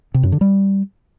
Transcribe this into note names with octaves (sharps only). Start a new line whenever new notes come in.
C3
F#2
D3
G3